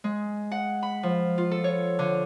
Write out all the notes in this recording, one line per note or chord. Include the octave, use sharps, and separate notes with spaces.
G#3
F#5
B5
F3
F4
A4
C#5
D3